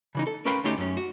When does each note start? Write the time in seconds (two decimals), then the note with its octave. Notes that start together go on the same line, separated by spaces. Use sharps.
0.15 C#3 E3 D#4
0.27 A4
0.45 C#4 A#4 B4 F5 G5 C6
0.64 D2 A3 C#4 D#4 G4 C6
0.78 F#2 C#4
0.97 F#4